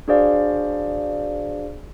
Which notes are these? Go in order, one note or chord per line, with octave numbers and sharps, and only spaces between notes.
D4 F#4 G#4 C5 D5 F5